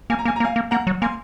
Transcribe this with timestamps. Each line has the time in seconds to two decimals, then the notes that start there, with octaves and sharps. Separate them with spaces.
0.10 A#3 G#5
0.19 A#5
0.25 A#3 G#5
0.36 A#5
0.40 A#3
0.44 F5 G#5
0.56 A#3
0.71 A#3 F#5 A#5
0.87 F#3
1.02 A#3 G#5 C6